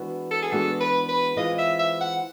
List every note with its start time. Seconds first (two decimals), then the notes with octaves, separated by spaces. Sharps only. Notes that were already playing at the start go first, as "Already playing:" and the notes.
Already playing: E3 G#3 B3 D4 F#4
0.31 A4
0.42 G#4
0.52 E3 G#3 B3 D4 F#4 A4
0.80 B4
1.08 B4
1.37 E3 G#3 C4 F4 D#5
1.59 E5
1.79 E5
2.01 F#5